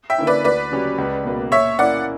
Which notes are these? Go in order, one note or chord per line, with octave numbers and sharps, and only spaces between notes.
E5 G5
D3 A#3 C#4 E4
B4 D5
D2 B4 D5
C#3 F#3 C#4 G4
C#2
B2 A#3
A#2 C#5 E5
A#3 C#4 E4 D5 F#5